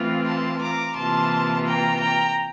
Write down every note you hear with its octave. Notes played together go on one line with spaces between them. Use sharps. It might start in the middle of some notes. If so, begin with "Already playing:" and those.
Already playing: E3 A3 C4 F4
A5 C6
A#5 D6
C3 E3 A#3 F4 A5 C6
G5 A#5
G5 A#5